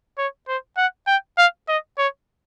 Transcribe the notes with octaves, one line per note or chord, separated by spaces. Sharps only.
C#5
C5
F#5
G5
F5
D#5
C#5